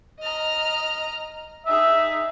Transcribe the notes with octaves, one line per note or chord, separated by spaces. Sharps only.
D#5 A#5 F6
D#4 G#4 E5